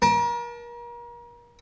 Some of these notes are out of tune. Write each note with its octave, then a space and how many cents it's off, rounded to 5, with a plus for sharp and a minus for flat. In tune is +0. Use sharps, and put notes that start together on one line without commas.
A#4 +35 A5 +0